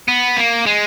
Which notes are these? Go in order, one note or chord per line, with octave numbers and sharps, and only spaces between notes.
B3
A#3
G#3